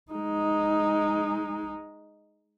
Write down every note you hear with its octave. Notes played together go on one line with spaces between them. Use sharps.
G#3 D#4